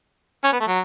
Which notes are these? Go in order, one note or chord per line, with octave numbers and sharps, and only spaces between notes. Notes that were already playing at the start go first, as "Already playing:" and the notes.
C#4
B3
A3
F#3